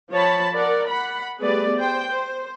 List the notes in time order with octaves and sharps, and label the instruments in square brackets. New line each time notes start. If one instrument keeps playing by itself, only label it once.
[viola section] F3 C#5 A5 B5
A#4 D5 F#5
F#5 B5
G3 A3 B3 G#4 B4 D5
C5 G5
C5